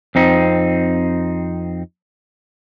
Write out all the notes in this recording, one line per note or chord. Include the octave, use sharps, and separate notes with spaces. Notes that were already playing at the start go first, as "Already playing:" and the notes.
F2 C4 D#4